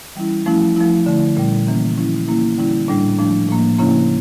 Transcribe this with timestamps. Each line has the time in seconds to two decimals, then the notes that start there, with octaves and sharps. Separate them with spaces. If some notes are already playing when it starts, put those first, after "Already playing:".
0.16 E3 G3 C#4 E4
0.46 F3 A3 C#4 E4
0.77 F3 A3 E4
1.06 D3 A3 E4
1.37 A#2 G3 C#4
1.67 E3 A#3 C#4
1.97 F3 C#4 E4
2.28 E3 A#3 C#4 E4
2.58 D3 G3 C#4 E4
2.88 A2 G3 D4
3.19 F3 A3 D4
3.49 A2 F3 A#3
3.79 C#3 F3 A#3 C#4 E4